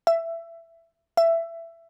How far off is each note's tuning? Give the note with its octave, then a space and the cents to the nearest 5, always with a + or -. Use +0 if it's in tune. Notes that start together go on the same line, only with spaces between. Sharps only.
E5 +15
E5 +15